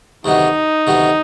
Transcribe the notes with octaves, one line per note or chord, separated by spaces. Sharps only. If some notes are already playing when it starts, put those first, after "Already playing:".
D2 C3 D#3 F#3 B3 D#4
D2 C3 D#3 F#3 B3